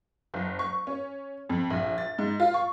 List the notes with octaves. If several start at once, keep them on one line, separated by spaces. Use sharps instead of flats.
F#1
C#6
C#4
F2
A#1
A6
G#2
F4
C#6